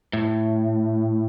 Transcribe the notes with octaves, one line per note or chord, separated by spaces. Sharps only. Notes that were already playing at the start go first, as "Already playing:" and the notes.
A2